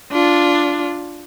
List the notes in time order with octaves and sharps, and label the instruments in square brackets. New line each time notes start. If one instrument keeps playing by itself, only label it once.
[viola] D4 F4